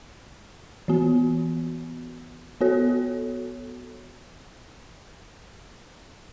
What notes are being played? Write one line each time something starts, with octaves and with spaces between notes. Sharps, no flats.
E3 B3 F#4
B3 F#4 A4 C#5